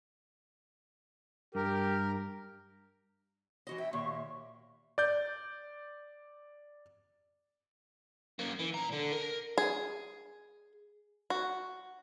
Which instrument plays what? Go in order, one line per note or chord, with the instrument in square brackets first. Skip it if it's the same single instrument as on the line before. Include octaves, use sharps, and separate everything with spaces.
[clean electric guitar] G2 [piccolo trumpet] G4 [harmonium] A#4
[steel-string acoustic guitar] E3 F#4 D#5
[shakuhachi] E5 [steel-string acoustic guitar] G5
[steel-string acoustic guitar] D#2 A#2 [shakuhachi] C#6
[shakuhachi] E5
[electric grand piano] D5 G6
[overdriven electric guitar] F#2 A#3
E3
A#2 A#5
D3
A#4
[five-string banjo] G#4
F#4